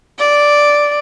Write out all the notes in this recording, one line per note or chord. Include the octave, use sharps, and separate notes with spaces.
D5